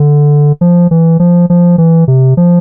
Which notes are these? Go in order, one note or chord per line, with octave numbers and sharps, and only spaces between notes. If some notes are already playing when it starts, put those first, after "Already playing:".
Already playing: D3
F3
E3
F3
F3
E3
C3
F3